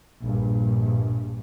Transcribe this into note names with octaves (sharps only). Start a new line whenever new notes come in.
A#1 G2